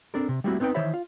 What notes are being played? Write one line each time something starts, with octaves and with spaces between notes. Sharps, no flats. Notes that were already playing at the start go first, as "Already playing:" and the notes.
C4 D4 A4 A#4
C3
G3 A3 A#3 C4 E4 F#4
B3 C4 D#4 B4 G5
D#3 E3 C5 C#5 E5 B5
F4 F5